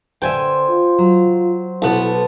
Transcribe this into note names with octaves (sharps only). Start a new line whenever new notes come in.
D3 A4 C5 E5 G5 G#5
F4
F#3
B1 B3 E4 A4 B4 A5